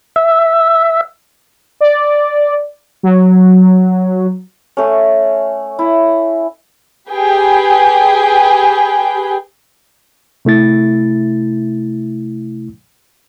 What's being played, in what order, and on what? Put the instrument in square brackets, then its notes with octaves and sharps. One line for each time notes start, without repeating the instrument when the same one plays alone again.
[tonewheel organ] E5
[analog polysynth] D5
F#3
[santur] A3 C#4
E4
[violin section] G4 G#4 B4 G5
[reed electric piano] C3 A3 E4 A6